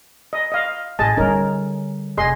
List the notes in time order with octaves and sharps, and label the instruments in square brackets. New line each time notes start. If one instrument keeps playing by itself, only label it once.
[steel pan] D#5
D#5 F5
[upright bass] A1 [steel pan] G#4 D#5 A5
[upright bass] D3 G3 [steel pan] C#4 D#4 A#4
[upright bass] F1 [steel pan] G#4 D#5 C6